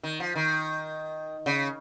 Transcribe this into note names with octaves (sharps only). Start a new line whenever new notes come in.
D#3
F3
D#3
C#3